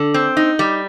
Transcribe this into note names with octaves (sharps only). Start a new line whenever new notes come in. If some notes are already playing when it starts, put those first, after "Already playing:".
Already playing: D3
C4
D#4
G3